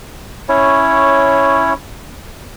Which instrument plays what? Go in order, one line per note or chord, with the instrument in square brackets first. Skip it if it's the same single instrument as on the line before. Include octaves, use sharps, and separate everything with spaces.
[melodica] C#4 E4 C#5